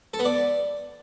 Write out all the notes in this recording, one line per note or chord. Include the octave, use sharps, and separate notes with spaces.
A4
B3
D5